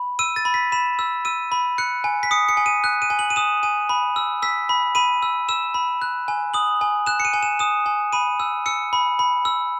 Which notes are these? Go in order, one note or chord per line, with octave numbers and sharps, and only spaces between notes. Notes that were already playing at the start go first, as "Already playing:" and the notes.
Already playing: B5
E6 D#7
A6
B5
B6
B5 E7
E6
E6 D#7
B5
F#6 C#7
G#5
B6
D#6 C#7
C#7
G#5
D#7
F#6
D#7
G#5
F#7
D#7
D#6 E7
G#5 D#7
B5
E6
E6 B6
B5
B5 D#7
E6
E6 E7
B5
F#6
G#5
D#6 F#7
G#5
F#6 E7
C#7
D#7
G#5
E7
D#6 E7
G#5
B5 D#7
E6
E6 C#7
B5
B5
E6